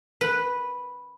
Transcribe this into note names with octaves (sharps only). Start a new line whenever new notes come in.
B4